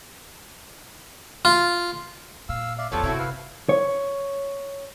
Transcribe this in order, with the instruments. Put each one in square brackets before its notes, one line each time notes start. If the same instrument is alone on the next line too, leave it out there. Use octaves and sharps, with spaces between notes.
[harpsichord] F4
[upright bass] A#2 [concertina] F5 E6
[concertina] D5 E5 F5
[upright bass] E2 C#3 [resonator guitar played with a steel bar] F3 G3 B3 [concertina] A4 C#5
[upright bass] G1 C3 [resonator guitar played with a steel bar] C4 E4 F#4
[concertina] B4 F5
[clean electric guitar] C#5